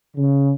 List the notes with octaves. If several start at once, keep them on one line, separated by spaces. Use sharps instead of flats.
C#3